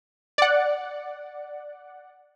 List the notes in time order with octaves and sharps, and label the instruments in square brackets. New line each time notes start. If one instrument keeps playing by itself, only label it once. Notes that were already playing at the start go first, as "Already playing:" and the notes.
[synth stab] D5 F#5